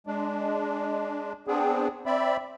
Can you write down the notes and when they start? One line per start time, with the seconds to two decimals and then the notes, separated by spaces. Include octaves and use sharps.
0.07 G#3 D4
1.48 B3 C4 D4 G#4
2.06 C4 D5 E5 B5